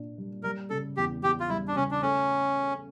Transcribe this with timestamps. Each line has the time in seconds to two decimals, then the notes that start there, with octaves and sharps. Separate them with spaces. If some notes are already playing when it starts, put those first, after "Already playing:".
Already playing: A#2 D4
0.18 G3
0.43 G3 A#4
0.70 C#3 A4
0.97 E2 G4
1.22 E2 G4
1.40 F4
1.50 G3 E4
1.68 D4
1.76 C#3 C#4
1.91 D4
2.02 A3 C#4